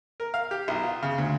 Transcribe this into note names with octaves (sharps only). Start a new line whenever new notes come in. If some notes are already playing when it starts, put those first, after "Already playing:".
A#4
F5
G4
B1
F4
C#3
D2